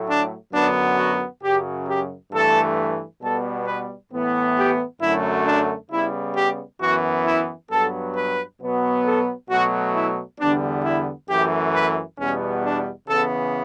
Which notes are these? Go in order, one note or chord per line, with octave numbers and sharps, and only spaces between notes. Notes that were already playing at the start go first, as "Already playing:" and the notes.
Already playing: A2 F#3 A3
D4
F#2 D3 F#3 B3 D4
F#4
F#2 C#3 F#3 G4
G4
G2 E3 A3 A4
B2 G3 B3 A4
B4
A2 E3 B3
G4
F#2 D3 F#3 A3 E4
D4
C#3 G3 B3 E4
G4
F#2 E3 B3 F#4
E4
G2 F#3 B3 A4
B4
B2 F#3 B3
A4
B2 F#3 A3 F#4
E4
E2 D3 G3 B3 D4
E4
F#2 E3 A3 G4
B4
E2 B2 G3 B3 C#4
D4
C#3 E3 B3 A4